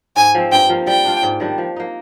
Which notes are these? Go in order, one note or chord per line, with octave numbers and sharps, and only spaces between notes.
G#2 G#5
F3 C4
G2 G5
F3 A#3 F4
G3 G5
D4 F4
G#2
D#3 G3 D4
F3
A#3 D#4